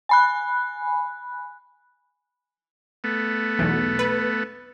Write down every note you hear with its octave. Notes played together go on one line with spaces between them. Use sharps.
G#5 B5 F#6
A3 B3
B1 E2
B4